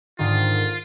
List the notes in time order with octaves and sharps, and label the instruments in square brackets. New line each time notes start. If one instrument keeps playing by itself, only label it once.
[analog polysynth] G#2 D3 D#3 [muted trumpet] F4